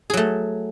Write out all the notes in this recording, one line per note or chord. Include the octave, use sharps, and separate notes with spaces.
F#3 A3 G#4